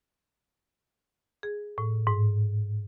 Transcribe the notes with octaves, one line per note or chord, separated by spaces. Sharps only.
G#4
A2
G#2